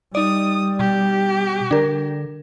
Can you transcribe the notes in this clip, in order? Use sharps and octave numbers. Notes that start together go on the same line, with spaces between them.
G3 D#4 D5 D#6
B2 G4
D3 D4 A#4